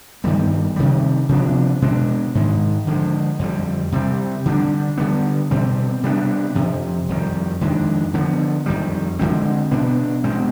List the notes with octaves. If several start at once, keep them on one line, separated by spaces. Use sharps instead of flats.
G2 D#3 G3 B3
C3 D#3 G3
C3 F3 B3 D4
B2 G#3 D4
G#2 D#3 G#3
D3 F3 G#3
F2 D3 G3
C3 G3 C4
D3 G3 D4
D3 G3 B3
B2 G3 C4
C3 G3 B3 D4
F2 C3 F3
F2 D#3 G3
F2 D#3 G#3 D4
D3 F3 B3
F2 D#3 G3
D3 F3 G#3 C4
B2 B3 D4
B2 G#3 C4